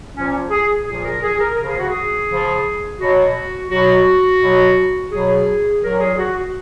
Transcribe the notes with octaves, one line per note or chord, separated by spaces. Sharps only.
A#2 F3 C#4
G#4
A#2 F3 G#4
A#4
G#4
A#4
C#3 F3 A#4
G#4
F#4
G#4
C#3 F3
B2 F#3 F#4
B2 F#3 F#4
B2 F#3
B2 F#3 G#4
A#2 F#3 A#4
G#4
F#4